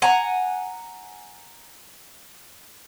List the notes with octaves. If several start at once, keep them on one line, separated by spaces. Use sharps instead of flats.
F#5 G#5 A#5